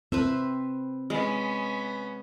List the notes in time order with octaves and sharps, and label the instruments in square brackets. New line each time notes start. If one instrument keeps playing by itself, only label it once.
[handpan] C4 [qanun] B4 C5 E5
[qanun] G#3 [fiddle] B3 C#4